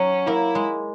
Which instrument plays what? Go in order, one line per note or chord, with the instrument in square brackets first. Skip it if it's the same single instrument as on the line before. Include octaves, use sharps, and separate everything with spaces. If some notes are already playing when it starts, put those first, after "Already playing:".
Already playing: [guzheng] F#3 [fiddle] C#4
[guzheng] A#3 [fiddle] E4
[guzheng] G#3